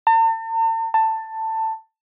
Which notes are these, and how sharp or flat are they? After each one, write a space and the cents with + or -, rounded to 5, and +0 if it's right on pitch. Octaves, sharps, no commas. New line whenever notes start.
A5 +45
A5 +15